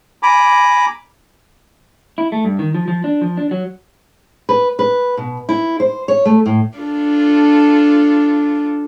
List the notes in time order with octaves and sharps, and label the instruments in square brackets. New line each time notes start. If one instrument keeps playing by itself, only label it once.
[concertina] G#5 A#5 B5 D6
[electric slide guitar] E4
A3
G2
D#3
F3
F3
D4
F3
D4
F#3
[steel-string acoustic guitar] B4
B4
B2
E4
C5
C#5
A3
A2
[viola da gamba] D4 F4 A4